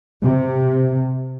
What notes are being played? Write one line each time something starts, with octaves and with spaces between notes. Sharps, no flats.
C3